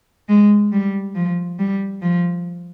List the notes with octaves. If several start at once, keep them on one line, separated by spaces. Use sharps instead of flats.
G#3
G3
F3
G3
F3